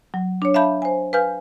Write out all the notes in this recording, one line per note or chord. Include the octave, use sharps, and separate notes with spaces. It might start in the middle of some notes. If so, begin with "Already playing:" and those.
F#3
D4 C#5
E5 F5 A5 B5 G6
C5 G#5
B4 F5 G#5 F6 G6